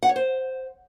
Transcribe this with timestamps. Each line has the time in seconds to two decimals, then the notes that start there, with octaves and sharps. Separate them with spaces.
0.03 F#5
0.09 C#5
0.16 C5